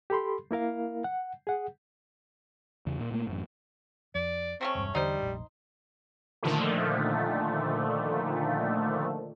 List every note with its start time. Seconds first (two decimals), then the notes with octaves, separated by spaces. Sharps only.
0.10 G4 A4 B5 C6
0.51 A#3 E4 A#4 F5
1.04 F#5
1.47 G#4 F#5
2.86 E2 C#3
2.99 A#2
3.11 A#2 A3 A#3
3.27 A1 F#2 A2
4.15 F2 D5
4.61 C3 A3 C4 C#4
4.75 E1 G2
4.95 E2 D3 G3 D#4 C5
5.20 F1 A#1
6.43 A#2 D3 D#3 F3 A3